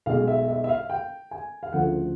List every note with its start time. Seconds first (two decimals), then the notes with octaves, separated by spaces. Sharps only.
0.06 B1 B2 G#3 F5
0.28 E5
0.48 E5
0.64 E5
0.69 F5
0.90 G5
1.31 G#5
1.63 F5
1.73 D2 C#3 F3 A3 F#5